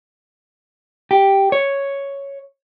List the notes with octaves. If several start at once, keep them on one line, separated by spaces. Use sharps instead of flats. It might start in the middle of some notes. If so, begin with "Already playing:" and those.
G4
C#5